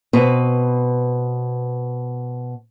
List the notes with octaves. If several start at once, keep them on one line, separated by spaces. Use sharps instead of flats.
B2 C4 B4